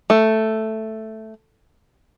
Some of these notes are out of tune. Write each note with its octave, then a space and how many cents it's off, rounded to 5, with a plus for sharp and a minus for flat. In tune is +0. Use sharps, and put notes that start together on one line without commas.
A3 +0